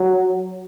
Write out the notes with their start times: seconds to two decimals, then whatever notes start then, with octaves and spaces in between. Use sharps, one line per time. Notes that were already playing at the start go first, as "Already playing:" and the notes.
Already playing: F#3